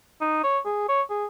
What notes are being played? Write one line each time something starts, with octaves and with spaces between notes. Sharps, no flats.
D#4
C#5
G#4
C#5
G#4